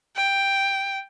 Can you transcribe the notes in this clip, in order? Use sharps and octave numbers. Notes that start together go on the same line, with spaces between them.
G5